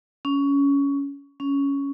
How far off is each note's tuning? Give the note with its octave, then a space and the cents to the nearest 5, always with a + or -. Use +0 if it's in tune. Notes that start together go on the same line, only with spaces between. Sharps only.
C#4 +15
C#4 +10